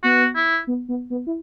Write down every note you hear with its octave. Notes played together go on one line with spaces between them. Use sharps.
B3 F#4
E4
B3
B3
B3
E4